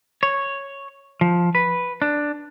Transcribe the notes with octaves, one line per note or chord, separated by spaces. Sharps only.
C#5
F3
B4
D4